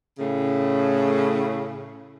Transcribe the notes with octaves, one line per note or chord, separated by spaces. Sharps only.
A2 C#3